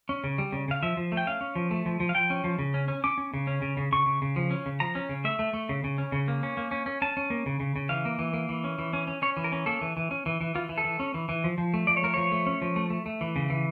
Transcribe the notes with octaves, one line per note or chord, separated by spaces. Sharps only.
C#4
C#3
G3
C#3
C#3 F5
F3 E5
F3
A3
G5
C#4 F5
C#4
F3
A3
F3
F3
F5
F3 G5
C#4
F3
C#3
C#4
C#4
C#4 D6
C#4
C#3
C#4
C#3
C#3
C#3 C#6
C#3
C#3
F3
C#4
C#3
F3 A#5
C#4
C#3
A3 E5
A3
A3
C#3
C#3
C#4
C#3
A#3
C#4
A#3
C#4
C#4
C#4 A5
C#4
A#3
C#3
C#3
C#3
E3 F5
A#3
E3
A#3
E3
C#4
E3
C#4
C#4
C#4 C#5
E3
A#4
C#4
A#3 A4
E3
E3
C#4
E3
E3
E3 F4
E3
A4
E3
C#4
E3
E3
F3
F3
A3
F3 D5
C#5
A3 A#4
F3 C#5
A3
C#4
F3
A3
A3
A3
E3
C#3
E3